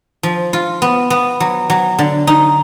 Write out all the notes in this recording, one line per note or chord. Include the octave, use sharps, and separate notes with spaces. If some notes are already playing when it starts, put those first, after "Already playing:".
F3
F4
B3
B3
F#3
F#3
D3
D#4